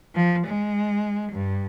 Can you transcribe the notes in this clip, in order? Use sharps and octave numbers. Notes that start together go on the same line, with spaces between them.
F3
G#3
G2